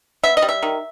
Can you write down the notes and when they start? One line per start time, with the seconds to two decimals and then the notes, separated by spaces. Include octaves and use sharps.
0.23 B3 E5
0.37 D#5
0.42 G3
0.49 E5
0.63 D#3